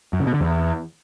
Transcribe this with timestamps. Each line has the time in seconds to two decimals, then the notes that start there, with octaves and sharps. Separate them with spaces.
0.13 F#2
0.20 C#3
0.27 B2
0.34 D3
0.41 E2